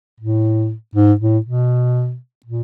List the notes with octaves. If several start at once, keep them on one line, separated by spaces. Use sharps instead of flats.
A2
G#2
A2
B2
A#2